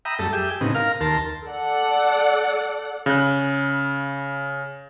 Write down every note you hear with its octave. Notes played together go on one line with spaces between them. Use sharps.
E5 G5 A#5 B5 D#6
F#2 G3 A3 A4
G4 G#4 E5 G5
A2 C#3 B3 C4 D#4
A#4 F5 F6
D#2 A#4 A5 C6
A4 D5 F#5
C#3 F#6